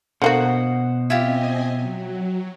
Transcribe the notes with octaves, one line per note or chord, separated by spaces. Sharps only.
B2 D3 A#3 F#4 C5 F#5
C4 E4 F4 G4 D#5 G#5
F#3